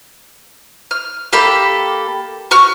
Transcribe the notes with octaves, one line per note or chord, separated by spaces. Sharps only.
F6
A#3 G4 A4 B5
F#4 C#6 F6